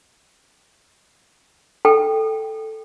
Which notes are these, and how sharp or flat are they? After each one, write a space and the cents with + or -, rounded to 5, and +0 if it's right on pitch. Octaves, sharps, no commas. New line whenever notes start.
A4 +0 G5 +0